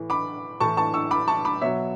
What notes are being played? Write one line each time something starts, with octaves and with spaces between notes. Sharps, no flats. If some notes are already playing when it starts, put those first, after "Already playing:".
Already playing: A2 E3
B5 D6
A2 E3 A5 C#6
A5 C#6
C#6 E6
B5 D6
A5 C#6
B5 D6
B2 F#3 C#5 E5